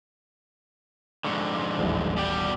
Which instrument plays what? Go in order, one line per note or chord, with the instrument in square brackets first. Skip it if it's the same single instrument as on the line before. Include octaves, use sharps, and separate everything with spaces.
[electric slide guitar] F2 G#2 D3 [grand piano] C#6
[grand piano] C6 D6
D#1 A1 E4
[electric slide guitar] B2 D5 G5